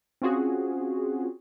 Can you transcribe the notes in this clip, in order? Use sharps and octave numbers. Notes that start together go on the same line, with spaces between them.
C4 C#4 F4 F#4 G#4